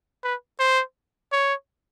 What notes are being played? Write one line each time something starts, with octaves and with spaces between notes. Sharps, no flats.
B4
C5
C#5